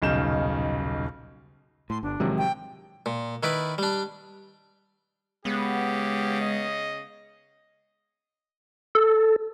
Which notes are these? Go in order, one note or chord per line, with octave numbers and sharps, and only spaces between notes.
D#1 B1 C#3 D#4 G6 E7
A2 C6
G1 D4
A1 C3 D#3 F3 F#3 G#3
G5
A#2
D#3 E4 B4 D5
G3 D4
C#3 G#3 B3 G4
D#5
A4